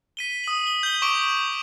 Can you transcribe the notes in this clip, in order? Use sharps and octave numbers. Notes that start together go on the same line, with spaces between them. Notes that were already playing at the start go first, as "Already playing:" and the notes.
B6 D#7 G7
D#6 F#7
G7
G6 G7
C#6 D6 B6 D7 G7